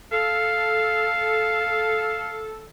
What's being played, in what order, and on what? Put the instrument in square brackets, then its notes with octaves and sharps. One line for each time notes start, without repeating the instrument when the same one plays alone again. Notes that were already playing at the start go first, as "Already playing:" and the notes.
[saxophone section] A4 [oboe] F5